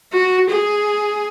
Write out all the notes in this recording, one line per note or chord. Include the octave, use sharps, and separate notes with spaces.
F#4
G#4